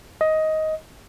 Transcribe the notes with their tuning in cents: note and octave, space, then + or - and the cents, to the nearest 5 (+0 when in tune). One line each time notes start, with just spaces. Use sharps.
D#5 +15